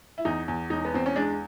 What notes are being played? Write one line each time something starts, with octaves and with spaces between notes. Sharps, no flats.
E4
E2 D#4
E2
E1 D#4
B3
E2 C4
C#4
G#3 D4